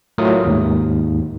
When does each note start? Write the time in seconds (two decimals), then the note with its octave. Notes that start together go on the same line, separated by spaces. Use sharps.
0.18 A2 F#3 A3 F4 A#4 D#6
0.45 D#2 G#2